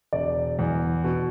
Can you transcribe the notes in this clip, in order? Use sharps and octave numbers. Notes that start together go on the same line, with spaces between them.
E1 D5
E2
B2